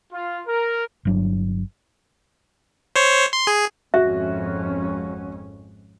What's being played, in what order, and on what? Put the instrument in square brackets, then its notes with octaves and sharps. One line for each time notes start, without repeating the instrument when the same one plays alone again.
[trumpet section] F4
A#4
[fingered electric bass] G1 F#3 D4
[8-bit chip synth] C5 C#5
C6
G#4
[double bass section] G#1 F2 C#4 [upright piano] F#4 [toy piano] E5